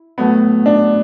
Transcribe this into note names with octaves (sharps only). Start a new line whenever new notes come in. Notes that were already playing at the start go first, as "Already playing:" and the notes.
Already playing: E4
A2 F#3 A3 B3
D4